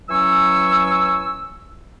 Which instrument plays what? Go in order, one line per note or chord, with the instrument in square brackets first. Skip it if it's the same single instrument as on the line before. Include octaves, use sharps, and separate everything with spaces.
[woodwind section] E3 F#3 C#4 G#5 C#6 E6